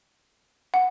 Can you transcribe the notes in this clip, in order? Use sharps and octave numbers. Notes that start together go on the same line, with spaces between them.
F#5